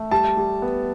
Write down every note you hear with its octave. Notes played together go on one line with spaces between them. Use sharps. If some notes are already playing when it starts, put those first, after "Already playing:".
Already playing: A3
G3 A5
G3
B3